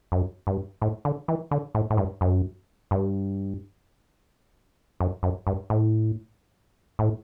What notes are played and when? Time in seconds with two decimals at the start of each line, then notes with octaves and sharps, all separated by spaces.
0.12 F#2
0.47 G2
0.82 A2
1.05 D3
1.28 E3
1.51 D3
1.75 A2
1.90 A2
1.97 G2
2.21 F#2
2.91 G2
5.00 F#2
5.23 F#2
5.47 G2
5.70 A2
6.99 A2